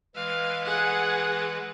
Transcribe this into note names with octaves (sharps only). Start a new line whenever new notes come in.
E3 G#3 B4 F5
G#4 F#5